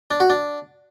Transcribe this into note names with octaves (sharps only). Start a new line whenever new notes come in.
D4
F#4
D4